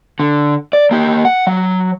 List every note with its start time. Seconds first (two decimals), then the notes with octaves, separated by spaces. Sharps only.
0.20 D3
0.73 D5
0.91 A#3 G4
1.25 F#5
1.47 F#3